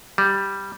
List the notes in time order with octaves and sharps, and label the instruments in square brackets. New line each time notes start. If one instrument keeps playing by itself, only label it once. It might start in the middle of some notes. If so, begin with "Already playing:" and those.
[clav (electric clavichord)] G3